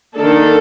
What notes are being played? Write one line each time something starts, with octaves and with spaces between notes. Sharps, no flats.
D#3 A#3 D4 A4